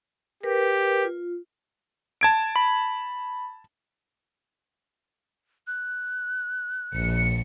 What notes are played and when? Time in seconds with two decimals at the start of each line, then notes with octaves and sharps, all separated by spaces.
0.43 G4 A#4 B4
1.05 F4
2.21 A5 G#6 D7
2.56 B5
5.67 F#6
6.94 A#1 C#7